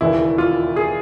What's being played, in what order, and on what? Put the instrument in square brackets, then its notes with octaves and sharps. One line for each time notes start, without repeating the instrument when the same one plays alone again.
[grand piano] E1 D#2 C#3 E3 E4
F4
G#4